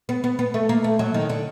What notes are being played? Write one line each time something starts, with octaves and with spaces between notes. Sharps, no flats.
B3
B3
B3
A3
A#3
A3
F#3
D#3
D3